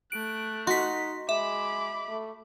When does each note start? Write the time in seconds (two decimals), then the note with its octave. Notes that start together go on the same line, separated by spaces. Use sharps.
0.12 A3 F#6 D7
0.67 D#4 F#4 C6 B6
1.29 G#3 E5 B5 D6
2.09 A3